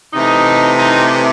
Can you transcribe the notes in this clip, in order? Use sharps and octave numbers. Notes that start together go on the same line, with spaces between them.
C3 E3 A3 D#4
D#4